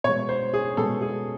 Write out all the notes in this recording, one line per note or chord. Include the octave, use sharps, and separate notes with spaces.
B2 G#3 C#5
C5
G#4
B2 G#3 A4
G#4